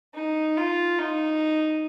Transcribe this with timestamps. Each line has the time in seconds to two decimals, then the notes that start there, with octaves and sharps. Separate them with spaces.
0.15 D#4
0.57 F4
0.98 D#4